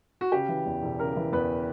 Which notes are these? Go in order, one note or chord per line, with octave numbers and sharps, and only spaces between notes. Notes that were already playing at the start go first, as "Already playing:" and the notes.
F#4
C#3 G4
E3
E2
E1
C#3 A#4
E3
E2 B4